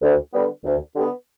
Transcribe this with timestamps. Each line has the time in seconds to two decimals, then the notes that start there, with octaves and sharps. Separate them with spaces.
0.02 D2
0.34 D3 G3 B3
0.65 D2
0.95 D3 G3 B3